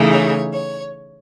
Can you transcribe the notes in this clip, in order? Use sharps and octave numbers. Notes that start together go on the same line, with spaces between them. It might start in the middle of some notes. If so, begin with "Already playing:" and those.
Already playing: C#3 E3 A3 D#4
C#5
C#5